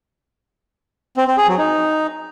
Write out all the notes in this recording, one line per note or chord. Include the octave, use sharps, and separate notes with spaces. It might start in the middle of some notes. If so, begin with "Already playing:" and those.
C4
C4
G#4
F#3
D#4